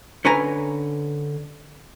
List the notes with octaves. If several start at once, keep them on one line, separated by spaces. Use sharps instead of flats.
D3 C#4 B4 G#5 A#5